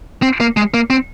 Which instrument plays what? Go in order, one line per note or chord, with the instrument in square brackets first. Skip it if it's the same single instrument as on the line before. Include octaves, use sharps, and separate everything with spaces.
[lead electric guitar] C4
A#3
G#3
A#3
C4